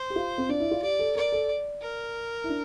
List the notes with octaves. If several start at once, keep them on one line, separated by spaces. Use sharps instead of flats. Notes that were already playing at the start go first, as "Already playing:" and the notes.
Already playing: C5
G4
F4
C4
D4 D5
E4
F4
G4 D5
A4
A#4 D5
A4
A#4
E4
D4